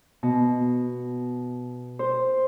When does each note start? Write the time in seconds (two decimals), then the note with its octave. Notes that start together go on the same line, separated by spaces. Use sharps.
0.23 B2
1.99 C5